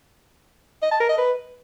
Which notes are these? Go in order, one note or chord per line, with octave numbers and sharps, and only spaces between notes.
D#5
A5
A#4
D#5
B4